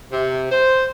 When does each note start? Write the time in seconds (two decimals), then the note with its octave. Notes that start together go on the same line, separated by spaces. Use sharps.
0.12 C3
0.51 C5